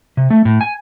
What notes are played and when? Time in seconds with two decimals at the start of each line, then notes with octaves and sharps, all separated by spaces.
0.17 C3
0.30 A3
0.45 A2
0.61 G#5